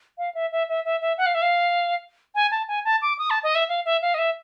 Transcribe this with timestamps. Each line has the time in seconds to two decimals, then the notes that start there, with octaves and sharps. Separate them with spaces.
0.18 F5
0.35 E5
0.52 E5
0.69 E5
0.85 E5
1.01 E5
1.18 F#5
1.26 F5
1.35 E5
1.42 F5
2.35 G#5
2.51 A5
2.68 G#5
2.85 A5
3.02 D6
3.19 D#6
3.30 A5
3.43 D#5
3.55 E5
3.69 F5
3.85 E5
4.02 F5
4.14 D#5
4.18 E5